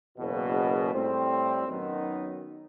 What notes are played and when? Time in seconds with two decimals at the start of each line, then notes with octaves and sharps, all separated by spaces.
0.17 F#1 E2 B2
0.92 A2 G3 C4
1.67 F#2 D#3 F#3 B3 D#4